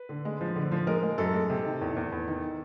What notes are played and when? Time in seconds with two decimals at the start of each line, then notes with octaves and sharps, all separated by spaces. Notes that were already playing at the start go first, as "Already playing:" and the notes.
Already playing: B4
0.09 D3
0.25 G#3
0.41 F3
0.56 D3
0.72 F3
0.87 G#3 A#4
1.03 G#3
1.18 F#2 A4
1.34 G#3
1.50 C3
1.65 D#3
1.81 E2
1.97 E2
2.12 E2
2.28 D#3